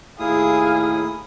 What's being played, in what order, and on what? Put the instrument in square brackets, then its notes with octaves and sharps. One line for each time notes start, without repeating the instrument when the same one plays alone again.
[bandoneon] D#2 E4 D#6 [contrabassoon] A2 [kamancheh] G#4 [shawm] F5